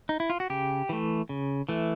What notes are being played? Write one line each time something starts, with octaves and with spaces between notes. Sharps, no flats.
D#4
E4
F4
F#4
C#3 G4
E3 A3
C#3
E3 A3